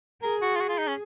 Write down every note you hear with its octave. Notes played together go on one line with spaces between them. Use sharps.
G#4 A#4
F#4
F4
F#4
F4
D#4
C#4